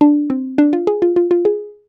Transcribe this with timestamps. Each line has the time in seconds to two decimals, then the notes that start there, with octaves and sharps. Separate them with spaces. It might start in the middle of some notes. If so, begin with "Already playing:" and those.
0.01 D4
0.30 C4
0.58 D4
0.73 F4
0.87 G#4
1.02 F4
1.16 F4
1.31 F4
1.45 G#4